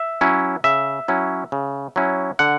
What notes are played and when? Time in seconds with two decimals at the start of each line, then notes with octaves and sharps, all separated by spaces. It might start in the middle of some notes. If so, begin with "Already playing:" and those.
Already playing: E5
0.21 F#3 C#4 E4
0.64 C#3 E5
1.08 F#3 C#4 E4
1.52 C#3
1.96 F#3 C#4 E4
2.39 D3 F#5